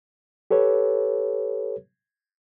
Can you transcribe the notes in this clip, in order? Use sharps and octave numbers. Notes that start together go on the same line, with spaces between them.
G4 A4 B4 C#5